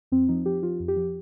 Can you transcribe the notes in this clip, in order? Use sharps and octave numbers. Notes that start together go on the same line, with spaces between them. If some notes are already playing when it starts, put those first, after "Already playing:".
F2 C4
F3 D#4
F3 G4
F3 F4
F2
G4
F3